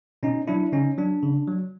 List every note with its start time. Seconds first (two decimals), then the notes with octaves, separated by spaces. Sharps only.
0.23 B2 C#4 D#4
0.47 F#3 D4 E4
0.72 C#3 C#4 D#4
0.98 F#3 D4
1.23 C#3
1.48 F#3